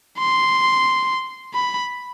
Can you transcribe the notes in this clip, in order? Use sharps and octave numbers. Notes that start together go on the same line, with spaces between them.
C6
B5